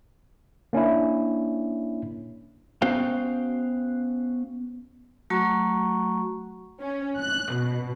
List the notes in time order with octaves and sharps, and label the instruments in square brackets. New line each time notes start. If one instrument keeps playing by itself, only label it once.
[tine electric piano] A#3 C#4 D4 E4
[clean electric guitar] B3 C#4 F#4 C5 F5 G5
[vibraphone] F#3 A3 F#4 A#5 C#6
[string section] C#4
F#6
B2